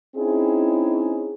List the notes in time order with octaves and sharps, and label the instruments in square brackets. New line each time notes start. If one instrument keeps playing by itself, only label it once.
[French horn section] C4 C#4 D#4 E4 G#4